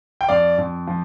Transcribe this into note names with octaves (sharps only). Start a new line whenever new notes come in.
G5
F2 D5 F5
F2
F3